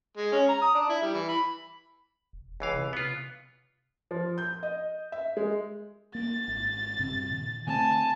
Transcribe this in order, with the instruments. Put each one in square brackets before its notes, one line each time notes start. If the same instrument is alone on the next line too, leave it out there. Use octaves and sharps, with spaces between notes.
[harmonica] G#3
C#4
A#5
D#6
D4
E4
G3
E3
B5
[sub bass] E1
[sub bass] E1 [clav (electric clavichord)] C#2 E3 F5
[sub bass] C3
[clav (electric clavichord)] B3 F4
[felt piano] F3
G6
D#5
E5
G#3
[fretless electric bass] A#3 [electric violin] A6
[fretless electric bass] G#1
G2 C3 C4
A#2 D#3
[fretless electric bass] D3 A3 C4 [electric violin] G#5 A5